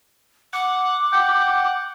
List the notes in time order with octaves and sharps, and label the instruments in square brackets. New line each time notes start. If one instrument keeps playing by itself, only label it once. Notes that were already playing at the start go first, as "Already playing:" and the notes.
[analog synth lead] F#5 [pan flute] D6
[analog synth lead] F#5 [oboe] G5